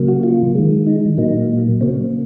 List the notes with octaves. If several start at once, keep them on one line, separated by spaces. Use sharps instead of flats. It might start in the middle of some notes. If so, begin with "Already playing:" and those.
Already playing: C#3 F#3 A#3
F#4
F4
D#3 G#3
D#4
A#2 F#3 A#3 D#4
C#3 F#3 A#3 C4